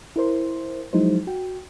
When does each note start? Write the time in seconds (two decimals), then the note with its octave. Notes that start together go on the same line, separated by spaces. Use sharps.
0.16 E4 A#4 C5 C6
0.93 F3 F#3 G#3 D#4 E4 C5
1.27 F#4 G5